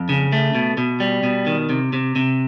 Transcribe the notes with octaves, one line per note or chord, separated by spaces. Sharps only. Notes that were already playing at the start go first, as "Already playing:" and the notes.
Already playing: F2
C#3
A3
B2
B2
G3
B2
D#3
C3
C3
C3